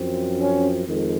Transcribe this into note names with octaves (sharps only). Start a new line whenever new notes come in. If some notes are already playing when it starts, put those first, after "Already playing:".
Already playing: F#2 F3 C4
C#4
F2 D#3 G#3